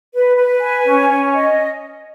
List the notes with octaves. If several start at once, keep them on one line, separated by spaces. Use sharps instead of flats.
B4
B4
G#5
C#4
C#4
D#5